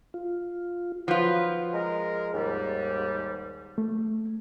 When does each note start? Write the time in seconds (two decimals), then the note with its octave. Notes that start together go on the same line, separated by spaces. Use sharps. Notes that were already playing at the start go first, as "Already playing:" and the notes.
0.14 F4
1.08 F3 F#3 B3 F4 B4
1.72 G#3 A#4
2.34 D#2 G#2 G3
3.78 A3